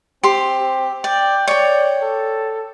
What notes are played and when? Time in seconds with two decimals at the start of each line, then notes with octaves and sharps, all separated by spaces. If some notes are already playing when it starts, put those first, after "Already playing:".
0.23 C4 G4 C6
1.04 D5 G5
1.47 C#5 D5 G5
2.02 A4